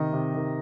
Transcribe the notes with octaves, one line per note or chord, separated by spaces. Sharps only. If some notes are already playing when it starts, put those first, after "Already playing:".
Already playing: C3 D#3 D#5
C3
D#3